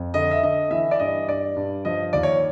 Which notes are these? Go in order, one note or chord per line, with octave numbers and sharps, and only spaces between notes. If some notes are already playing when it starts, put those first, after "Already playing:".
Already playing: F2
D3 D#5
E5
D3 D#5
E3 E5
D5
G2 D#5
G2 D5
G2
F3 D#5
D#2 D5
C#5